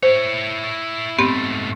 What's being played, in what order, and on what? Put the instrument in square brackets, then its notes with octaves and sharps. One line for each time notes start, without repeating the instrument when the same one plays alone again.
[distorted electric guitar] E4 C#5 [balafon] C5
[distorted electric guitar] G#2 A3 [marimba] B3 C4 G4